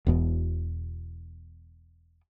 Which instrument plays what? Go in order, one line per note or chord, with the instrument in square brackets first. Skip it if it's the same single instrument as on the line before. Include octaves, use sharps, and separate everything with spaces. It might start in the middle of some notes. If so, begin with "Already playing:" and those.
[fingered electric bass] E1 E2 B2